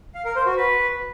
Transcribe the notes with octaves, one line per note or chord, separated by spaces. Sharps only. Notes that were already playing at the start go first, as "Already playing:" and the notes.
F5
A#4
C5
F#4
B4